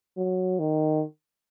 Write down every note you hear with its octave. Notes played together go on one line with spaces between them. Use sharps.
F#3
D#3